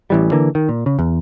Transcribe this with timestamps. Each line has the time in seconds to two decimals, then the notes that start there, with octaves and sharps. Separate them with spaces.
0.10 A1 E3 G3
0.32 D3 E3 A#3
0.55 D#3
0.69 A#2
0.86 C#3
0.99 E2